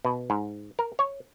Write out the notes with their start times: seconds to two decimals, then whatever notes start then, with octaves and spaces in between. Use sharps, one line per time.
0.05 B2
0.30 G#2
0.79 A#4
0.99 C#5